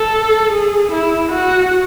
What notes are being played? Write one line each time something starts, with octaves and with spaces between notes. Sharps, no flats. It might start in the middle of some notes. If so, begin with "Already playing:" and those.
Already playing: A4
G#4
E4
F#4